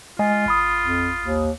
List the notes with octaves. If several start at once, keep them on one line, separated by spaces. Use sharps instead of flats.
G#3 F4 D#5 G#5
A1 B5 D#6
F2
D#2